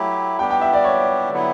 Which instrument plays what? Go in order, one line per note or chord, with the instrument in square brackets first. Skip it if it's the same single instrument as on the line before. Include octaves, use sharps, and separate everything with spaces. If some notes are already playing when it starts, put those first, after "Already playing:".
Already playing: [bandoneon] F#3 A3 E4 G4
[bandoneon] G3 B3 D4 G4 [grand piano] G5
[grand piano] G5
E5
D5
C#5
[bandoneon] D3 F#3 B3 E4